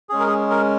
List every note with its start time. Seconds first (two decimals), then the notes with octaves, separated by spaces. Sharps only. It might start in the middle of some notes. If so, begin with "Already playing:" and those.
0.09 G#3 C#4 G#4
0.19 A#4
0.27 G#4
0.50 A#4